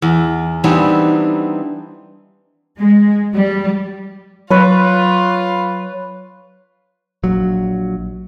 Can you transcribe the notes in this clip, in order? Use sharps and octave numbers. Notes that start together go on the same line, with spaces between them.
E2
E3 G3 B3 C4 D4 D#4
G#3
G3
F#3 F4 B4 C#5
A#1 F#3